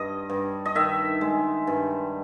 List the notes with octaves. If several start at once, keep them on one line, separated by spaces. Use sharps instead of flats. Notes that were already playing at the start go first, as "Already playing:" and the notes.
Already playing: G2 D#5
G2
D#5
D#3 E5
G#3
G2